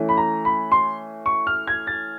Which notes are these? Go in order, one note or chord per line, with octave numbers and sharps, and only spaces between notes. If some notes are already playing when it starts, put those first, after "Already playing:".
Already playing: E3 A3 C#4
B5
A#5
B5
C6
C#6
F6
G#6
A6